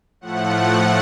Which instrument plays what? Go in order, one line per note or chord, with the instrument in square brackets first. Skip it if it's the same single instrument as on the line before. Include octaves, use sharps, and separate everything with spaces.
[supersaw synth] A2 F3 A3 F#5